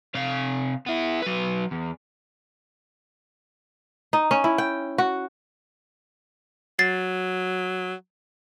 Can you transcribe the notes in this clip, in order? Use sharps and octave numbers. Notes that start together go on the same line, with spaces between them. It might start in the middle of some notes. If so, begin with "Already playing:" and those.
C3 F5
B3 E4
F#3 B4
E2
D#4
C#4
E4
G5
F#4
F#3 A6 C7